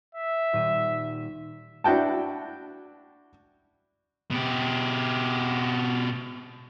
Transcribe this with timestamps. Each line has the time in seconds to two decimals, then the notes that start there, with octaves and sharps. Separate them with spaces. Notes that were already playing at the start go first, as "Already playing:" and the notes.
0.15 E5
0.53 D#1 D#7
1.84 D4 E4 F#4 G5 A5
4.31 B2 G4